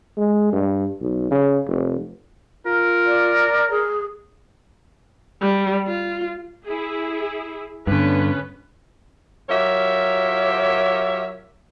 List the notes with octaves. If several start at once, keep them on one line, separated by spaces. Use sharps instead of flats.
G#3
G2
B1
C#3
F1
F4 A#4
D5
G#4
G3
F4
E4 G#4
G2 D3 B3 C#4 B4
F#3 F4 G4 A#4 C#5 E5